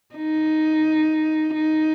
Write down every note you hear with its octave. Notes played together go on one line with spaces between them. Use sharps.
D#4
D#4